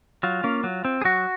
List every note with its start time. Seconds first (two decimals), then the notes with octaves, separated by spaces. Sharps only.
0.23 F#3 F4
0.44 A#3 C#4
0.64 F#3
0.85 C4
1.02 G#4
1.04 F#3 F#4